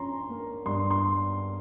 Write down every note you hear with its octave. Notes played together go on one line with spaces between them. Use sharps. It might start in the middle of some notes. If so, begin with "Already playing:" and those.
Already playing: F3 C#4 A#5 C6
A#3
G2 C6
C6